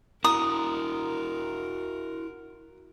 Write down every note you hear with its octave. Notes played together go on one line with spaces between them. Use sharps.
E4 F#4 A#4 A#5 D#6